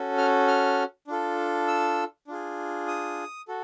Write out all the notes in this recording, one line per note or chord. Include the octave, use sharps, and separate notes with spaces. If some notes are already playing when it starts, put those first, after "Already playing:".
Already playing: C#4 F#4 A4
F6
F6
D4 F4 A4
E6
D4 F4 G#4
D#6
F#4 A4